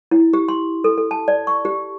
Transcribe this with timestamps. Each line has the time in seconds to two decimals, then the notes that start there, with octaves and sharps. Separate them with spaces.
0.11 E4
0.33 G4
0.48 C6
0.84 A4
0.98 A4
1.11 A5
1.28 D5
1.47 C#6
1.65 G4